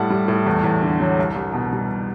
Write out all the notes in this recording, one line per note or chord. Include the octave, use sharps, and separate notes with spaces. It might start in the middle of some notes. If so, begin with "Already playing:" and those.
Already playing: A2 G3 F#5 A5
G3
A2
E2
E2
D3
F#3
C2
C2
B2
G3